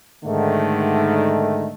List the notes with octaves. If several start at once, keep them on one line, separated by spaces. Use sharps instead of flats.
G#2 D3 D#3 A3